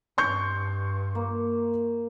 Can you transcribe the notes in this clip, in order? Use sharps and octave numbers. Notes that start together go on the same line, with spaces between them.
G2 C6 C#6 G6
A#3